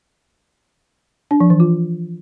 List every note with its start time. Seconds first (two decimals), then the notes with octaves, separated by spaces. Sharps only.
1.31 D4
1.40 F3
1.50 E3
1.60 F4